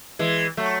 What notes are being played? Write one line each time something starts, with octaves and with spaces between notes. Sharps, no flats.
E3 G#3
F#3 A3